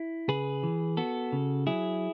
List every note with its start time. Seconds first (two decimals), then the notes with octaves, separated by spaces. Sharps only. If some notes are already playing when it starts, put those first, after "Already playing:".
Already playing: E4
0.28 C#3 G#4 B4
0.63 E3
0.97 B3 F#4 A4
1.32 C#3
1.67 F#3 E4 G#4